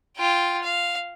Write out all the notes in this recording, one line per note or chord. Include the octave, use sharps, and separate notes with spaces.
F4 G5
F5